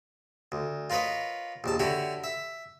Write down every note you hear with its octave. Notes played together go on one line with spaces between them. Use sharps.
D2
F4 A#4 B4 C#5 D#5
A#1 D#2 A5
D3 E4 F#4 G4 C#5
E5